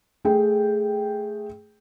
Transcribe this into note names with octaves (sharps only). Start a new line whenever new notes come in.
A3 G#4 G5